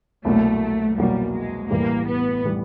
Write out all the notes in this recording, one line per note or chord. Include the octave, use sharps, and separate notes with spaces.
C2 B2 F#3 A3 A#3
C2 B2 F#3 G3 A#3
G#3
A1 A2 E3 G3 A#3
B3
A2 E3 G3